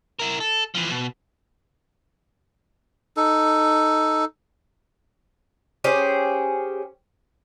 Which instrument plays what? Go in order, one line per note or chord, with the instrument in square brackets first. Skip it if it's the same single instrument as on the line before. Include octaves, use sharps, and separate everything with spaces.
[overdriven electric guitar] E4 A#4
A4
E3 F3
B2
[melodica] D#4 A4
[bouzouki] C#4 G4 G#4 C5